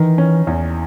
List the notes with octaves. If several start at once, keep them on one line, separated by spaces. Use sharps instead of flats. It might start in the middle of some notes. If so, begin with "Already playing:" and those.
Already playing: D#3 E3
C#4
E2